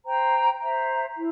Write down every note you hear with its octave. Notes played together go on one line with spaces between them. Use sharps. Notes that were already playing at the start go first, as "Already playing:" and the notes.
C5 G5 A#5
C5 E5 A#5
E4